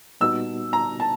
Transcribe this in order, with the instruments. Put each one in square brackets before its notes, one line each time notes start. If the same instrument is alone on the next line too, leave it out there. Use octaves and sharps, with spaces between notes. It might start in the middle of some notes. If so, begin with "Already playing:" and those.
[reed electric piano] A#2 G3 B3 D#4 F#4 [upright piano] E6
[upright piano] A#5
A5